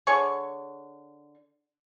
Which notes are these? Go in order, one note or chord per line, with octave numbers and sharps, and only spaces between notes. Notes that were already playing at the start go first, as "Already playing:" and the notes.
D3 G#4 C#5 C#6